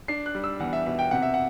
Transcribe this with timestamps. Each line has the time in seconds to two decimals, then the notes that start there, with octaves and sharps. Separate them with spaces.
0.08 D4 C7
0.26 F#6
0.35 G3
0.44 E6
0.60 E2 F#5
0.73 E5
0.86 B2 E5
0.99 G5
1.11 C3 F#5
1.22 E5
1.34 F#5